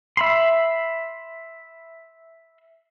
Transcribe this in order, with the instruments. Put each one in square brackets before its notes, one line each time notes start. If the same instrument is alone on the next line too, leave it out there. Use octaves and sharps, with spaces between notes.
[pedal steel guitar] E5 B5 C6